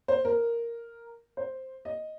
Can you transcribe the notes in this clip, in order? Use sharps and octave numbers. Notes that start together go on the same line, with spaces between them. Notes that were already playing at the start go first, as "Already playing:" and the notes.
C5
A#4
C5
D#5